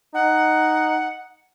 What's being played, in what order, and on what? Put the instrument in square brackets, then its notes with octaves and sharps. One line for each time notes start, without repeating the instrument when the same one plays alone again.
[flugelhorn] D#4 [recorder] F#5